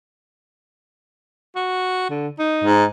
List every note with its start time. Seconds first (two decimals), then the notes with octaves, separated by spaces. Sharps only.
1.56 F#4
2.10 D3
2.39 D#4
2.64 G#2